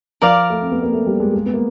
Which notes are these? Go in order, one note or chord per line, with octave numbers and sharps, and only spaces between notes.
F3 A#4 D5 F5
A3
C4
B3
A#3
A3
G3
G#3
G#3
B3
A#3